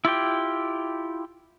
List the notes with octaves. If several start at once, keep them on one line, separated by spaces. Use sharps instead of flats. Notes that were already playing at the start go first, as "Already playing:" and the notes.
E4 F4 G4 G5